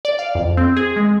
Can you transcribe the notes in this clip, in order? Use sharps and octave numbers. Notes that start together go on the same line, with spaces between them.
D5
F5
F2
C4
G#4
G#3